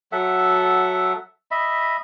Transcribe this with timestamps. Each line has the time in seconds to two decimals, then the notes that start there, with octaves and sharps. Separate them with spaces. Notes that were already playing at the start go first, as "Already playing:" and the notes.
0.12 F#3 A4 E5 F#5
1.51 D#5 E5 B5